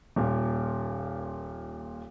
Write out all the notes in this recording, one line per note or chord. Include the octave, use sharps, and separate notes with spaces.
D#1 A#2